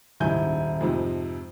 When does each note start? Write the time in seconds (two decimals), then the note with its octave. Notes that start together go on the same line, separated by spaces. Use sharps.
0.20 D#1 C#2 G#2 E4 G#5 G6
0.81 F2 G#2 C3 F3